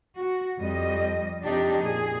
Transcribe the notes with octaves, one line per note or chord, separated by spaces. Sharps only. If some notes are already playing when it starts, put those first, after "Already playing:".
F#4
F2 G3 D#5
F2 C3 D4 D#4 G4
A#2 G#4